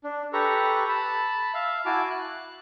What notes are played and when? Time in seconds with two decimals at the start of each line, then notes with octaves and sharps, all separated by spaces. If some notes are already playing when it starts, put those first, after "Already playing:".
0.04 D4
0.33 G4 A4 B4 A#5 C#6
0.89 A5 B5
1.54 E5 F5
1.86 E4 F#4 G#5 A5 D6
2.10 F#6